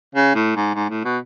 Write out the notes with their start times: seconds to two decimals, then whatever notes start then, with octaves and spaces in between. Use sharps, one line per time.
0.15 C#3
0.35 A2
0.56 G#2
0.74 G#2
0.90 A2
1.04 B2